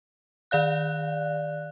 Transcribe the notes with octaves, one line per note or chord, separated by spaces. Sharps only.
D#3 D5 F5 F#6